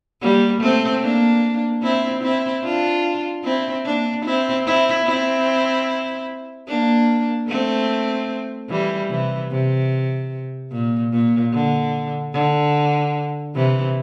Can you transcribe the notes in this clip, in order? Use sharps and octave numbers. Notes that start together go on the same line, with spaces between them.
G3 A#3
A3 C4
A#3 D4
C4 E4
C4 E4
D4 F4
C4 E4
A#3 D4
C4 E4
C4 E4
C4 E4
A#3 D4
A3 C4
E3 G3
C3 E3
C3
A#2
A#2
D3
D3
C3 E3